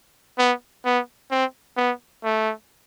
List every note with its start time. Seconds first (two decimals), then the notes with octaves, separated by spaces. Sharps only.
0.38 B3
0.85 B3
1.31 C4
1.77 B3
2.24 A3